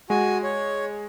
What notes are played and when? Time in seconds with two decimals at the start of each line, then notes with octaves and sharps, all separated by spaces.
0.10 G#3 F#4 G#5
0.43 C#5